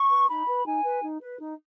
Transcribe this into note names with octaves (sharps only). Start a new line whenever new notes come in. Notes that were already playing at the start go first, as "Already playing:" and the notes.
Already playing: C#6
B4
D#4 B5
B4
D#4 G#5
B4
D#4
B4
D#4